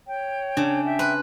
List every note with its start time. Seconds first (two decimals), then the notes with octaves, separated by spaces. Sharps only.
0.07 C#5 G5
0.57 C#3 D4
0.85 E5 G5
0.99 B4 C6